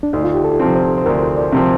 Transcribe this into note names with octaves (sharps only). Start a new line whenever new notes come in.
D4
D2 D#4
F4
G4
A4
C3 F3 C4
C5
C5
D2 A#4
D5
C3 F3 C4